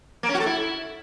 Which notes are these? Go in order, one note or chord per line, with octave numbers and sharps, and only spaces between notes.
A#3
C#4
F#4
A4
E4